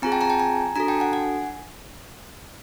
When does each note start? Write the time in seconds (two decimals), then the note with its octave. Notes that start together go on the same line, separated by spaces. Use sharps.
0.02 C4 F4 G#4 G#5 A#5
0.12 G5 A5
0.21 G#5 A#5
0.30 G5 A5
0.40 G#5 A#5
0.76 D4 F#4 A4 G#5 A#5
0.88 G5 A5
1.00 F#5 G#5
1.13 F#5 G#5